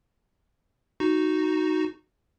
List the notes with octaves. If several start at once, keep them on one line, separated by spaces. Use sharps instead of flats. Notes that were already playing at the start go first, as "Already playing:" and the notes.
D#4 F#4